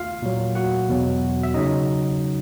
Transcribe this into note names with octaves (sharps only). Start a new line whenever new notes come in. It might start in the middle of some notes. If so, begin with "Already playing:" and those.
Already playing: F4 F5
A#2 F#3
F#4 F#5
E2 B2 F#3
E5
C#3 F#3 D#4 D#5